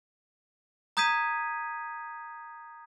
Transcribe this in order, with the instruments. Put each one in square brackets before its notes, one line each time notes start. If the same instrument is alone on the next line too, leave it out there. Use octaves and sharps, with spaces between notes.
[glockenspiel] A#5 D#6 G6 G#6 B6 D#7